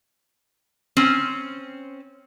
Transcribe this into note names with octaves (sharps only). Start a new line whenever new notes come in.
C4 C#4